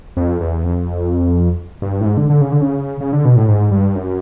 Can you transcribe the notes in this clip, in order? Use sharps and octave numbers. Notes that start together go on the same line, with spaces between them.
F2
E2
F2
G2
A2
G#2
D3
D3
C#3
D3
C#3
C#3
D3
B2
A2
G#2
G2
F#2